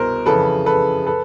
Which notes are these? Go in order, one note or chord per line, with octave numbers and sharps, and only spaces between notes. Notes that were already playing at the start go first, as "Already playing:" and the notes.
Already playing: C2 B2 A#4 C5
F2 C#3 E3 A4 B4
A4 B4
A4 B4